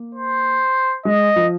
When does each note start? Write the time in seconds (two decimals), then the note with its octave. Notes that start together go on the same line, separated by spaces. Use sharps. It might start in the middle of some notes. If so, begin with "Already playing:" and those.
Already playing: A#3
0.15 C5
1.05 G#3 D#5
1.36 F3